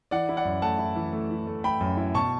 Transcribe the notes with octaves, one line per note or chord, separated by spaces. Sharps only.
E3 D5 F#5
E4
D5 F#5
F#2
A3 F#5 A5
E4
E3
A3
E3
A3
A3 G5 B5
F#2
E4
B2 A5 C#6